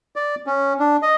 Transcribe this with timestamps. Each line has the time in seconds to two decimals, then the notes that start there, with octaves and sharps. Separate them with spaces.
0.16 D5
0.47 C#4
0.80 D4
1.03 D#5